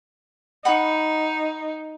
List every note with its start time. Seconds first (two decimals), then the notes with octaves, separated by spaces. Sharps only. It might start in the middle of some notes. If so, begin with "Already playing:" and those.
0.65 D#4 F#5 B5 C#6